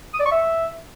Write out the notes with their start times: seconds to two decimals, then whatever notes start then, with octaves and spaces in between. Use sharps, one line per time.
0.14 D#6
0.20 D5
0.26 C#6
0.32 E5